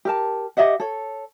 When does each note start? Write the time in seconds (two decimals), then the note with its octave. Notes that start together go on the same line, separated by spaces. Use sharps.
0.05 G4 A#4 A5
0.57 G4 D#5 E5 F#5
0.80 A4 C#5